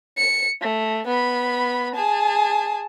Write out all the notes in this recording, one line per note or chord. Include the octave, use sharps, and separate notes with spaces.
C#7
A3
B3 B5
G#4 A5